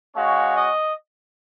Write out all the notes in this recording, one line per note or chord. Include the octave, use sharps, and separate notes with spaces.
G#3 C#4 F#4 F5
D#5